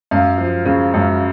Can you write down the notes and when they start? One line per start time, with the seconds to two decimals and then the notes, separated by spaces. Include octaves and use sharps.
0.11 F#2 F5
0.38 F3
0.65 C#3
0.94 F#2